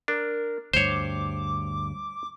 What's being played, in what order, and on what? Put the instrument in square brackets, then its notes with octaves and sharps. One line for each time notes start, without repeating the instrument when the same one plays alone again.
[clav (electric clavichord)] D4 [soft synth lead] A#4
[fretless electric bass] D2 G2 [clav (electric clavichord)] C5 C#5 [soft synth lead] D6